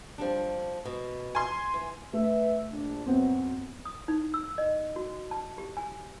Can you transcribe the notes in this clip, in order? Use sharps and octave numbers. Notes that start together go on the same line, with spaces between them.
F3 G3 D4
B2
G#5 C6
E3
A3 B4 E5
A#1 D4
F#2 B3 C4
D#6
D#4
E6
D#5
F#4
A5
G4
G#5